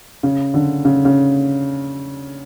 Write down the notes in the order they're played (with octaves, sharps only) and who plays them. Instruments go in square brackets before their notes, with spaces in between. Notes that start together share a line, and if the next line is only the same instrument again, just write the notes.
[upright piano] C#3
D3
C#3
C#3